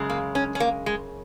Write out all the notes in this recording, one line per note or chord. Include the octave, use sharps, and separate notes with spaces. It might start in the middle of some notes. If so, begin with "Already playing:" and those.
Already playing: F#2 C#3 G#3
A#3
C#4
C#4
A#3
G#3